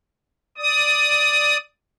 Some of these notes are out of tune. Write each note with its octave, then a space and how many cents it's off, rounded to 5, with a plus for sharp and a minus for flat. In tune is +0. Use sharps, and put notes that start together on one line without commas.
D5 +5 D#6 +15